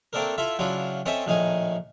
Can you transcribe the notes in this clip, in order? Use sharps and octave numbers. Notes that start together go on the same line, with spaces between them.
A3 A#3 C4 D4 A4 A#4
E4 F4 A4 E5
C#3 F#3 D4 E4 F4
C4 C#4 A4 D#5 E5 A5
A#1 A2 D#3 D#4 G#5